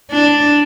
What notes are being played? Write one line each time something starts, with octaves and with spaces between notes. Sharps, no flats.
D4